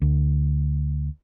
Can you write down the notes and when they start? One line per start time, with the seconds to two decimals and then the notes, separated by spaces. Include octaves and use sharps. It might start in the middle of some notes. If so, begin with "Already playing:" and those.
0.02 D2